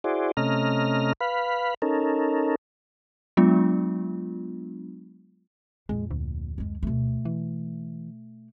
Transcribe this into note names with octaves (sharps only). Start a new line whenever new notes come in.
E4 F#4 G#4 C5 D5
C3 A3 C#4 D#5 A#5 F6
B4 F5 B5
C#4 D#4 A4 A#4
F#3 G#3 B3 D4 F4
F2 A#2 G#3
D2
F#2 G#3
B2 A3
E3